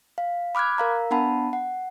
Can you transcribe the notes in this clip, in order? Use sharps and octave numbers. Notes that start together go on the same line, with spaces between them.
F5
B5 D6 F6 F#6 G#6
A#4 F5 A#5
B3 D4 F#5 A5 B5
F#5